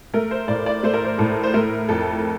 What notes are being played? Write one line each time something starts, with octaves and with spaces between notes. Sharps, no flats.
A3 A#4
C5
A2 D5
D5
A3 C5
A#4
C5
A2 A4
C5
A3 A#4
F2 A4